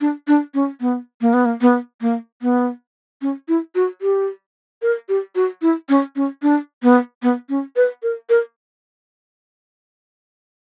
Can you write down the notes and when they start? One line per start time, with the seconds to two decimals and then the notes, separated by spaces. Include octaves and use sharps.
0.01 D4
0.28 D4
0.54 C#4
0.81 B3
1.21 A#3
1.34 B3
1.46 A#3
1.61 B3
2.01 A#3
2.42 B3
3.22 C#4
3.48 E4
3.75 F#4
4.02 G4
4.82 A#4
5.09 G4
5.35 F#4
5.62 E4
5.89 C#4
6.16 C#4
6.42 D4
6.83 B3
7.23 B3
7.49 C#4
7.76 B4
8.03 A#4
8.29 A#4